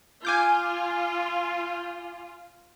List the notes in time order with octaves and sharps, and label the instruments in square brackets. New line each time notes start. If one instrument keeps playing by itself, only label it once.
[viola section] F4 [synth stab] G#5 D6 G6